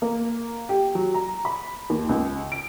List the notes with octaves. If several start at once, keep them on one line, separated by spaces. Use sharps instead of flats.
A#3
G4
F#3
A#5
B5
D#2
C#2
D7